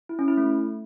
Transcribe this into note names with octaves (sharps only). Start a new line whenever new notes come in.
E4
C#4
E4
A3